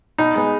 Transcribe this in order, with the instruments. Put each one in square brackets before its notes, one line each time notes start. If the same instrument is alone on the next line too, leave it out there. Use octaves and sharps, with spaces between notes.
[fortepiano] B2 D#4
G#3 B3